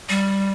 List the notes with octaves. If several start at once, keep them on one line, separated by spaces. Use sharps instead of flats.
G3